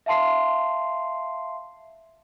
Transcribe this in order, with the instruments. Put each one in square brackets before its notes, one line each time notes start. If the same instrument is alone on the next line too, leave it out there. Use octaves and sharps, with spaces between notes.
[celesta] E5 F5 A5 C6 C7